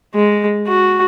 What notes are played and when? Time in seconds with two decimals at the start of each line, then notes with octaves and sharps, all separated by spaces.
0.15 G#3
0.67 F#4